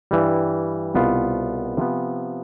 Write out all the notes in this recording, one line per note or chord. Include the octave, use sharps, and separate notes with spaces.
G2 E3 G3
C2 B2 B3 F4
C3 F3 B3